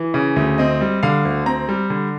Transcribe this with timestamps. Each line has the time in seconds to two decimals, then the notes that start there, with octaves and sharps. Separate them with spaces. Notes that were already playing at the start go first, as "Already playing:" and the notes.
Already playing: E3
0.14 C#3
0.36 D2
0.58 C4 D#5
0.81 G3
1.03 D3 F5
1.25 D2
1.46 C4 A#5
1.69 G3
1.90 D3